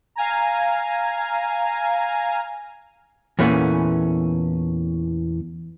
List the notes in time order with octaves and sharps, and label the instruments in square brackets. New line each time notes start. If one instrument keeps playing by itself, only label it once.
[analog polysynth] F5 G#5 A#5
[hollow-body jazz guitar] E2 A#2 E3 A3 B3 C#4